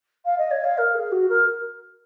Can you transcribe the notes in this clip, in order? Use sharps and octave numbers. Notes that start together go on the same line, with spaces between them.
F5
D#5
C#5
F5
A#4
G#4
F#4
A#4